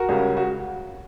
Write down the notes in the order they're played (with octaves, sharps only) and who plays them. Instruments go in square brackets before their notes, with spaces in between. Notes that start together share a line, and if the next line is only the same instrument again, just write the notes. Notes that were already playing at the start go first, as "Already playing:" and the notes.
Already playing: [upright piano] F#4 A#4
C#2 C#3 G3 C#4
F#4